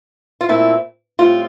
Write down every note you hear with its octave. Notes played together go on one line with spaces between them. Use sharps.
F4
A#2 A3 C4 E4
A2 G3 C4 F4